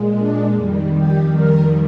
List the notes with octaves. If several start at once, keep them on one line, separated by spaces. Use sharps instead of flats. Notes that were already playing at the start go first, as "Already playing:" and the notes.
Already playing: A#2 G#3
D4
F2 D#3 G3
G4
A#4